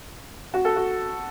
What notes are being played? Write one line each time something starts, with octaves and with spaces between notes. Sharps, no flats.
F#4
A4
F#4